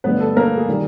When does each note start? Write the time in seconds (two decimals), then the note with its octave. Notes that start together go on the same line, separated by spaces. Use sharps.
0.04 G2 D3 F#3 A3 B3 B4
0.20 A4
0.36 A#3 A#4
0.57 G#4
0.69 D#3 G3